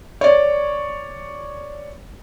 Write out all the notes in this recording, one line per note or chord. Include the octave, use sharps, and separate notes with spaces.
C#5 D5